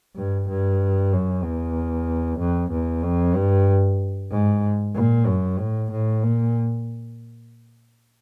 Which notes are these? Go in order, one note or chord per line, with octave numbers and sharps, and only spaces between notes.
G2
G2
F#2
E2
F2
E2
F2
G2
G#2
A#2
F#2
A2
A2
A#2